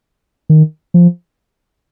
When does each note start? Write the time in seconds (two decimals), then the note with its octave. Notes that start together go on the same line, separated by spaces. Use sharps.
0.50 D#3
0.94 F3